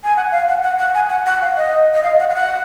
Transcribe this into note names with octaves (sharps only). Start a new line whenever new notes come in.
G#5
F#5
F5
F#5
F#5
F#5
G#5
F#5
F#5
F5
D#5
D#5
F5
F#5
F5
F#5